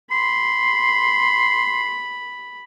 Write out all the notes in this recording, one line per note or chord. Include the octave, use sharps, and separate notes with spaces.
B5 C6